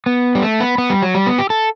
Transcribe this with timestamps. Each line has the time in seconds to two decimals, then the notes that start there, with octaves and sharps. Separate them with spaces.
0.06 B3
0.35 G3
0.42 A3
0.60 B3
0.78 B3
0.90 G3
1.02 F#3
1.15 G3
1.26 B3
1.38 G4
1.50 A4